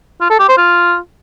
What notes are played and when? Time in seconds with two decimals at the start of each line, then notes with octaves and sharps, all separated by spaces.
0.21 F4
0.30 A4
0.39 G4
0.48 C5
0.58 F4